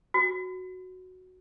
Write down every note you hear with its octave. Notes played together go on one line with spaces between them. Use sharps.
F#4